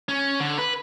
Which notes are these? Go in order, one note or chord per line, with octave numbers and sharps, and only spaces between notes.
C#4
D3
B4